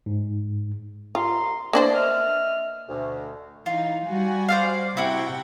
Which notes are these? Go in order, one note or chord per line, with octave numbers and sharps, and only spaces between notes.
G#2
C2 F4 A#5 C6
E3 A#3 B3 D4 C5 D5
D#5 E5 F6
D2 B2
E3 D#4 F4
G3 F#4 G#5
C5 D5 F5
C3 E4 F#4 F#5 G5